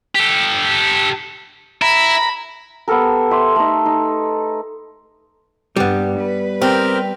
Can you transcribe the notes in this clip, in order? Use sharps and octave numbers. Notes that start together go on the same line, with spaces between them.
G4 A4
E4 A#5 B5
B3 G4 A4 A#4
E5 C6 D6
A3 D#4
D#4
G2 G3 B3
B4
C4 G4 A#4 F6